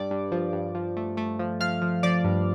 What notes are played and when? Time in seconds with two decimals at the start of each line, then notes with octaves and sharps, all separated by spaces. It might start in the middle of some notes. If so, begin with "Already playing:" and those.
Already playing: G2 D5 D6
0.11 G2
0.32 F3
0.53 G2
0.75 F3
0.97 A3
1.17 A3
1.39 F3
1.60 F3 F5 F6
1.82 F3
2.03 F3 D5 D6
2.24 G2